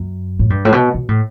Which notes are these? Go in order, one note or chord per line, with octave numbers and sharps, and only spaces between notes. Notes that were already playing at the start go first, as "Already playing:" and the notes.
Already playing: F#2
A2
G2
A2
B2
B2
A2